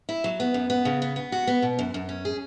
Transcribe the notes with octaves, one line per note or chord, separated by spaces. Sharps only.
E4
F#3
B3
F#2
B3
C#3
B3
B3
F#4
B3
B2
F#2
F#2
C#4
G#4